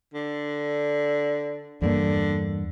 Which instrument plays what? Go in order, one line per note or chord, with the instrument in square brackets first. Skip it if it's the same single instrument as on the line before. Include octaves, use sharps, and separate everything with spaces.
[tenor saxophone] D3
[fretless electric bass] E2 G2 A#3 [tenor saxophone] D3